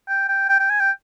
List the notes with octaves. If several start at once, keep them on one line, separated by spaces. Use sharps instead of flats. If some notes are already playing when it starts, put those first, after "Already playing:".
G5
G5
G5
G5
G#5
G5